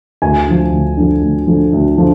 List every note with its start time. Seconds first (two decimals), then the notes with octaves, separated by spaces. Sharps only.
0.22 D2 G#5
0.47 D3 F3
0.72 D2
0.97 D3 F3
1.23 D2
1.47 D3 F3
1.73 D2
1.97 D3 F3